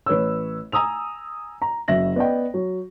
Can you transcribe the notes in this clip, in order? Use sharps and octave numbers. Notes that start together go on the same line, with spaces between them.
A1 B4 C#5 E6
G#5 A#5 D#6 E6 F7
A#5
F#1 F#4 E5 A#6 F#7
B3 D5 D#5 G5
F#3